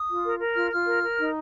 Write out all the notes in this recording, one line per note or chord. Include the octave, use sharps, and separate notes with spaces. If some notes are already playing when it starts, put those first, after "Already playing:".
Already playing: D#6
F4
A#4
A#4
F4 F6
F4 F6
A#4
A#4
D#4